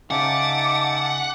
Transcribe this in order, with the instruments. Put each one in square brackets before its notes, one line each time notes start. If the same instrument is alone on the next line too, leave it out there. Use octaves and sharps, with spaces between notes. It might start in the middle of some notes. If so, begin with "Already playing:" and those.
[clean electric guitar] C#3 [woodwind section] D#4 E5 A5 [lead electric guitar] F#5 [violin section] D6